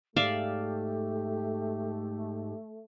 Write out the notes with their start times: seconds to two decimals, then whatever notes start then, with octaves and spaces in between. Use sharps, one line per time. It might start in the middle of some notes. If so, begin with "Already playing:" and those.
0.16 G#2 A3 G4 D5 E5 F5